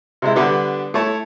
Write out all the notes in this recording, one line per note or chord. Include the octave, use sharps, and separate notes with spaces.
C3 G#3 E4
D3 G3 B3 D4
A3 E4 C#5 A5